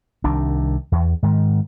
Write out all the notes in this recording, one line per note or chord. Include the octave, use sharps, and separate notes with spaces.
C2 C3 D#3 D4
E2
G#2 D#3